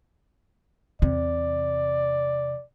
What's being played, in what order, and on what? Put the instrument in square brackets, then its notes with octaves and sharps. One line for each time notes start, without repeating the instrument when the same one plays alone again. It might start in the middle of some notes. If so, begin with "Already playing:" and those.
[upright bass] E2 C3 [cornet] D5